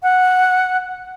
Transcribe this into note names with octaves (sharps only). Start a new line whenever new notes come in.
F#5